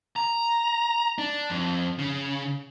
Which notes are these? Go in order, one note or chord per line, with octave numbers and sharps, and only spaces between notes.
A#5
D4
F2
C#3